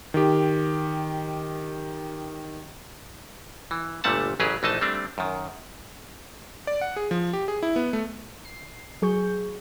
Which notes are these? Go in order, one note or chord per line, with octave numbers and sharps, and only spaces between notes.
D#3 G4
E3
G1 A#2 G3 A3 F#5 A5
A1 C#3 F#3 G4 G#4 B4
A#1 E3 A3 D#4 D#5 A5
G3 A3 C4 D4
F#2 D#3
D5
F#5
G#4
F3
G4
G#4
E4
B3
A3
C7
F#3 G#4 C#6 G6